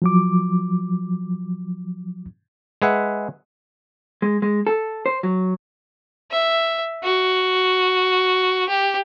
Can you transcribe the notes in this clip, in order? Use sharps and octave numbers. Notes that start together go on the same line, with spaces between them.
F3 F#3 D6
G#3 G#4 B4 E5 F#5
G#3
G#3
A4
C5
F#3
E5
F#4
G4